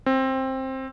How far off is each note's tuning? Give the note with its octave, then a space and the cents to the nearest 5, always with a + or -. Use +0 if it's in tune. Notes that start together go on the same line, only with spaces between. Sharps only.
C4 +15